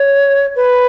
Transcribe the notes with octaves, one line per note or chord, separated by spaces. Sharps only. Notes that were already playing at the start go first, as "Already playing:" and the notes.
Already playing: C#5
B4